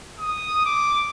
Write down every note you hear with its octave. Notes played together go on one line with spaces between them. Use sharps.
D#6
D6